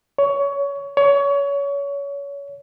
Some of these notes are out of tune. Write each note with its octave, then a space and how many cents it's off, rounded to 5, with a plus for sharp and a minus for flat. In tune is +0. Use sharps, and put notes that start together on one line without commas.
C#5 +20
C#5 +25